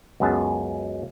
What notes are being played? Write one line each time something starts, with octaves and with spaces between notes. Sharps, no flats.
C#2 F#2 B3 G#4 A5